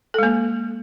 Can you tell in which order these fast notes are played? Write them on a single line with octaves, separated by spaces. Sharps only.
A4 G#3 A#3